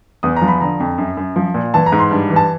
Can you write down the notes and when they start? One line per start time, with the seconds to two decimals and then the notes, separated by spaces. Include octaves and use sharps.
0.23 E2 D#6
0.37 A#5
0.42 F3
0.48 B5
0.61 D3 A#5
0.80 F2
0.98 F#2
1.17 F#2
1.36 F3
1.54 A#2
1.74 E3 A5
1.86 A#5
1.92 G#2
1.99 C6
2.11 G2
2.30 E3
2.36 A5